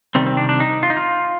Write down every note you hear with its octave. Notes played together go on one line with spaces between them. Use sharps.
C3 D#3 G3 C4
C4
D4
D4
D#4
F4
D#4
F4